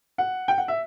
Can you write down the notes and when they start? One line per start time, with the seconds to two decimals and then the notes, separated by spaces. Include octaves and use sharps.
0.18 F#5
0.48 G5
0.58 F#5
0.68 E5